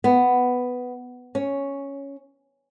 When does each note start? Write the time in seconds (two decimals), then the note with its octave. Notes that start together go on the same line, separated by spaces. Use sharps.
0.04 B3
1.35 C#4